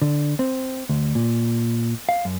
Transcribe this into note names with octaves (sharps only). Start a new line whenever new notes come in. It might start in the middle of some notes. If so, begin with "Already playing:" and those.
D3
C4
D2
A#2
F5
F#2